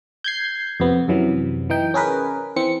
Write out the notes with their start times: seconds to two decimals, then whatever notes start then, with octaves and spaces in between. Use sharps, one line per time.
0.24 G6 G#6 C7
0.80 F2 C3 B3
1.08 F#2 C3 E3 F#3
1.70 E3 D#4 G5
1.94 C#4 G#4 A#4 B4
2.56 E3 C4 C#7